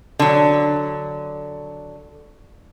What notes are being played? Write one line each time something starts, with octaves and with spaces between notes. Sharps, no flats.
D3 F#3